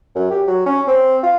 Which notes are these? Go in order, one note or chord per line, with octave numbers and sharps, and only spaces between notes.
F#2
G4
F#3
C#4
C4
F4